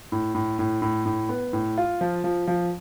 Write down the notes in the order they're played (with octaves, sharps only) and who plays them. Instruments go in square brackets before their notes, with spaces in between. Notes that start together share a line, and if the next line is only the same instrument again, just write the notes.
[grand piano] A2
A2
A2
A2
A2
B3
A2
F4
F3
F3
F3